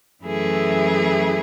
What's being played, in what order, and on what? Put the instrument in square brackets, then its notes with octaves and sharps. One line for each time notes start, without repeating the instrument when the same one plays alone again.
[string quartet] F#2 E3 A3 E4 G#4